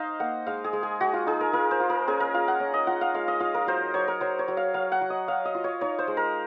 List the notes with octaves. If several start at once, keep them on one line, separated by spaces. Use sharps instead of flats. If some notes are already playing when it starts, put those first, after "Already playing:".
Already playing: D#4 C5 D#5 F5
A#3 F#5
G#3 F5
G#4
G#3
G#4
G#3 F#4
F4
D#4 G#4
A#4
F4 A#4
C5
F4
A#4
C#4 G#4
A#4
F4 F5
F#5
C#4
D#5
F4 F#5
F5
G#3 F5
D#5
F4 F5
A#4
F#3 C5
F#3 C#5
A#4
F#3 C5
C#5
F#3
F5
F#3 F5
F#5
F#3
D#5
F#3 F5
D#5
F4
C#5
D#4 C#5
C5
G#3
A#4